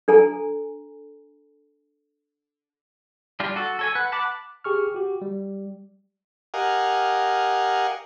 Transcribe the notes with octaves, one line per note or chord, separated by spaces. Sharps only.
D4 A4 G#5 A#5
G3 D4 F4
F#4 A4
A4 C#5 G#5
B4 F#5
F#5 A5 B5 D6
G4 G#4 C#6 F6
F#4 G4
G3
G4 A#4 D#5 F5 F#5 G#5